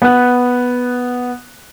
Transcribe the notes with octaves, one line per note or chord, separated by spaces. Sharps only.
B3 F#6